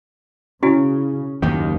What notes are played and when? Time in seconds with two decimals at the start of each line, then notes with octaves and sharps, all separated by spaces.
0.63 C#3 C#4 E4 F#4 G#5
1.42 F#1 D#2 D#3 G4